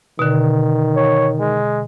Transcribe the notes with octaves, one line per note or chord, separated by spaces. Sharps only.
B2 D3 D#3
C#5
G#3